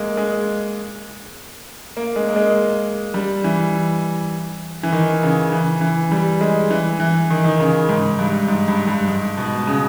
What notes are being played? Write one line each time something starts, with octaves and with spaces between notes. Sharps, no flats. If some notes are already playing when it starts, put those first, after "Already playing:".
Already playing: G#3 A#3
G#3
A#3
G#3
A#3
G#3
G3
E3
E3
D#3
C#3
E3
E3
G3
G#3
E3
E3
D#3
D#3
C#3
G#2
G2
G#2
G2
G2
G#2
B2
C#3